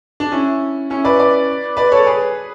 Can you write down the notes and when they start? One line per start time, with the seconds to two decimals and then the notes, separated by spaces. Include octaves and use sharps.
0.20 D4
0.32 C#4 E4
0.90 C#4 E4
1.05 B4 D5
1.19 B4 D5
1.77 B4 D5
1.92 A4 C#5
2.06 G#4 B4